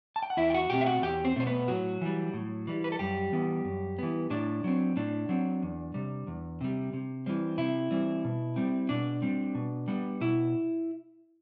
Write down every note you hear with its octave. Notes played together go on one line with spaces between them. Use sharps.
A5
G5
F#5
E2 E4 E5
G5
F#4 F#5
B2 A3 C4 G4 G5
E5
F#4 F#5
E2 G4 G5
C4 C5
B2 A3 C4 C5
B3 B4
A2 F#3 F#4
E3 G3
A2
E3 G3
B4
A4
F#2 G3 G4
E3 B3
F#2
E3 B3
A2 D4
F#3 C4
A2 D4
F#3 C4
E2
C3 G3
E2
C3 G3
C3
E3 G3 C4
C3 E4
E3 G3 C4
B2
G3 C4
B2 D4
G3 C4
B2
G3 B3
B2 E4